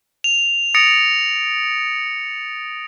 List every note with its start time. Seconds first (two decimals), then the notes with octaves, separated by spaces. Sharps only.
0.24 F7
0.75 D#6 A6 A#6 C#7 D7 F7